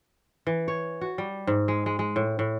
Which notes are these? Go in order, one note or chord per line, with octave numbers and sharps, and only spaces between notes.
E3
C#5
F#4
G3
G#2
G#3
G#3
G#3
A2
A2